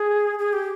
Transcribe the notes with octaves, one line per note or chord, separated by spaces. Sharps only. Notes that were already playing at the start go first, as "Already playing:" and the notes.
Already playing: G#4
G#4
G4